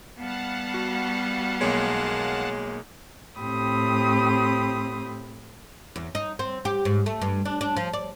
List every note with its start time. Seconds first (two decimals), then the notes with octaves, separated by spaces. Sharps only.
0.18 G3 B3 F5 F#5 A5
0.74 F#4
1.61 B1 G#3 A#3 C#5
3.38 A2 C4 G4 B5 D#6
5.96 E2
6.15 D#4
6.39 C4
6.65 G4
6.85 G#2
7.06 A3
7.21 G2
7.45 D4
7.61 D4
7.77 F3
7.93 D5